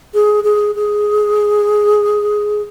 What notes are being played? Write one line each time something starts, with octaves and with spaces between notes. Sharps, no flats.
G#4
G#4
G#4